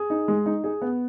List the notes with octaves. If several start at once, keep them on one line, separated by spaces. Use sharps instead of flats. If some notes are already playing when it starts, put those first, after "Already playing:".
Already playing: G#4
D#4
G#3
D#4
G#4
B3